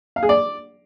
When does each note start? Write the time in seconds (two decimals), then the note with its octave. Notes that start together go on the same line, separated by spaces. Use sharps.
0.16 F5
0.23 G#4
0.29 D5